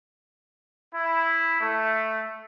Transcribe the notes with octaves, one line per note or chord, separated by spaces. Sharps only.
E4
A3